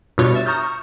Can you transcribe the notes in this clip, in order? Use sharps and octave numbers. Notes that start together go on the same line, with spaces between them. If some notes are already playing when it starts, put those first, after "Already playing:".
G2 B2 F4 C#5 C#6
E5 A6 E7
A#5 C#6 D#6 F6 G6
C#6